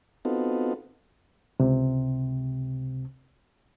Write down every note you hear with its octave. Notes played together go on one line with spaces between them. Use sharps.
B3 C4 D#4 F4 F#4 A4
C#2 C3